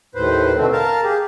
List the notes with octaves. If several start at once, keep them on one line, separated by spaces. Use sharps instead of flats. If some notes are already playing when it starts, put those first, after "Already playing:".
D#2 A2 B4 C5
B2 D3 A3 C4
A#4 F5 A5
G4 G#4